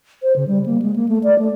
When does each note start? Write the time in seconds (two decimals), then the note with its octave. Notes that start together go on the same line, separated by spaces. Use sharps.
0.22 C5
0.36 C#3
0.48 G3
0.66 A#3
0.82 G#3
0.96 A#3
1.09 A3
1.24 D5
1.39 A3